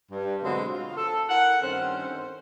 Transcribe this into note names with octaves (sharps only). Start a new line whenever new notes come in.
G2
B2 D3 F#3 G#3 B3 C4
F4
A4
E4 A#4 F5 F#5
G2 D#3 C4 C#4 A4 C5